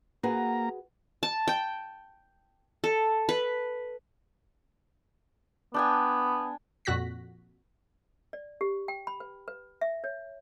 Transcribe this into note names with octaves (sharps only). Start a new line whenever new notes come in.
A#3 F#4 G#4 B4 A#5
A5
G5
A4
B4
B3 D4 G5 G#5
F2 A#2 F#4 F#6 A#6 B6
D5
G4
G5
B5
B4
B4
E5
C#5